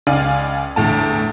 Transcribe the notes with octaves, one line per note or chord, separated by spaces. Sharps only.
C#2 D5 F5 G#5
G1 E2 A2 A5